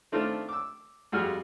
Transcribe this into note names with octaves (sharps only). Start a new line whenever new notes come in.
D#3 A3 C4 D4 F4
D6 E6
F2 G3 F4 F#4 G#4 F6